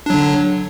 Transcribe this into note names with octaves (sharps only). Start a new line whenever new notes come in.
D3 F#3 D4